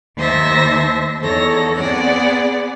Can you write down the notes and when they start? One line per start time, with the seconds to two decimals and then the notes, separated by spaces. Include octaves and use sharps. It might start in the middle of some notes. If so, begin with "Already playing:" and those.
0.17 D#2 C5 E5 A5 A#6
1.22 E2 D#4 A4 C#5 A#6
1.77 B3 C4 G#4 D5 F#5